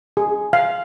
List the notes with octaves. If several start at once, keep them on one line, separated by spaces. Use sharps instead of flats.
G#4
F5